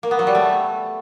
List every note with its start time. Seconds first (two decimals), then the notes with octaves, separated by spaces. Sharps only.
0.03 A#3
0.11 B3
0.19 F#3
0.27 G3
0.35 A3